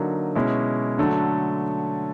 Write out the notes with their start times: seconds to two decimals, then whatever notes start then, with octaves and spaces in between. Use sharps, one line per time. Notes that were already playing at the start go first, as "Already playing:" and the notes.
Already playing: D3 F#3 A#3 D#4
0.35 B2 G#3 C#4 E4
0.98 D3 F#3 A3